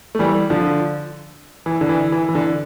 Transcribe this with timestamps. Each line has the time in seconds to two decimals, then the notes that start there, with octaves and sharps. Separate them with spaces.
0.15 A3
0.19 E3 G3
0.50 D3 F3
1.66 E3
1.81 D3
1.89 E3
2.12 E3
2.29 E3
2.35 D3